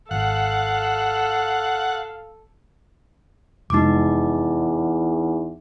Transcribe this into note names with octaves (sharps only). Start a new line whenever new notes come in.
G#1 A4 F5 F#5
F1 E2 G#3 D#4 D6